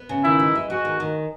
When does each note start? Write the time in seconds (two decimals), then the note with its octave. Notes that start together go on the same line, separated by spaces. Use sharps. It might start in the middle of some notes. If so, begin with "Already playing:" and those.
Already playing: B3
0.09 C#3
0.24 D#3 E4
0.40 G#3
0.55 G#3
0.70 G#3 F#4
0.85 D#3
1.00 D#3